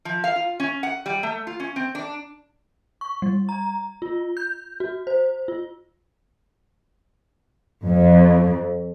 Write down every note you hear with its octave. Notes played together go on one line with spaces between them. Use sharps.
F3
F5
F4
C#4
F#5
G3
A3
F4
C#4
C4
D4
C#6
G3
A#5
F4
G6
F#4
C5
F4
F2